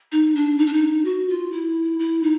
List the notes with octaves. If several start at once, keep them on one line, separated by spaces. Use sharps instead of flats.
D#4
D4
D#4
D4
D#4
F#4
F4
E4
E4
D#4